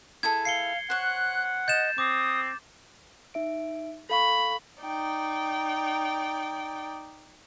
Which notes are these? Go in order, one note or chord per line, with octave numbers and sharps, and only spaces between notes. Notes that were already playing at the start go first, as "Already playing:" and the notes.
E4 G#4 A4 G#6
F5 C7 C#7 G7
C5 C#5 F#5 F#6
D#5 G6 A6 E7
C4 D6 D#6
D#4 E5 D7
A4 F5 B5 C#6
D#4 D5 G5